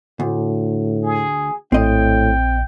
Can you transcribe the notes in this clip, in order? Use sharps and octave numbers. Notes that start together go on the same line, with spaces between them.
D2 A2
G#4
A#1 A2 C4 D#5 G5